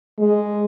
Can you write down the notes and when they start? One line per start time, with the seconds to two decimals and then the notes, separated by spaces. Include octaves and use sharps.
0.19 G#3